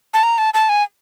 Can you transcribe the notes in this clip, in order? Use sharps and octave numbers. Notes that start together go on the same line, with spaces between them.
A5
A#5
A5
A5
G#5